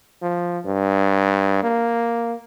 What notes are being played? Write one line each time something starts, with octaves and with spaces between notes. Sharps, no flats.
F3
G2
A#3